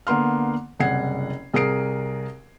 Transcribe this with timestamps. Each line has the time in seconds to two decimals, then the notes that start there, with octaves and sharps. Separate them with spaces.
0.07 D3 A#3 B3 C6 F6
0.80 F#1 C2 F#5 G#6 C7
1.53 C2 G#4 A#4 D#6 C7 D7